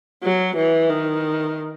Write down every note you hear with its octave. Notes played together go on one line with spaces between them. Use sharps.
F#3
E3
D#3